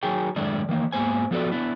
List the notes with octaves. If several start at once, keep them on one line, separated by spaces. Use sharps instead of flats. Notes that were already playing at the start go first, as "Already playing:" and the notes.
D#3 F#3 G#4 G5
F#2 A2 D#3 G#3 A3 D4
D#3 E3 A#3
G#2 A#3 B3 C5 G#5
F3 B3 F#4 A4 B4 D5
B3 D4 E4